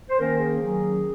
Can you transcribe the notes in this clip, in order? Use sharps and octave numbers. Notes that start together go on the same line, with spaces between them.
C5
D#3 A#3 C#4 A#4
G#4
D#3 F#3 C#4